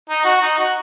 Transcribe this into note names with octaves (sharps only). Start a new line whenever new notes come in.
D#4
F#4
D#4
F#4